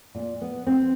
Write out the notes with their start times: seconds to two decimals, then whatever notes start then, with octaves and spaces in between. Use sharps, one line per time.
0.15 A#2
0.41 B3
0.67 C4